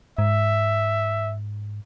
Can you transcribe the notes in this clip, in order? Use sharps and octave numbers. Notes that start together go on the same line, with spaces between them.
G#2 E5